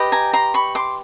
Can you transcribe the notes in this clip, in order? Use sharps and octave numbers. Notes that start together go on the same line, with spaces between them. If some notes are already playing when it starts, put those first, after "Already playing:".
Already playing: G4 B4 D#5
G#5 A#5
A#5 C6
B5 C#6
C6 D6